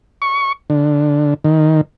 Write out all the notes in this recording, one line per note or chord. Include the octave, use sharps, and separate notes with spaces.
C#6
D3
D#3